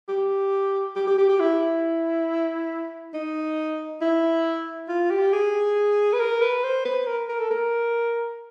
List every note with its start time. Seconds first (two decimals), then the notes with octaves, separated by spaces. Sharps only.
0.09 G4
0.96 G4
1.07 G4
1.18 G4
1.29 G4
1.40 E4
3.14 D#4
4.02 E4
4.89 F4
5.11 G4
5.33 G#4
6.13 B4
6.20 A#4
6.42 B4
6.64 C5
6.85 B4
7.07 A#4
7.29 A#4
7.40 A4
7.51 A#4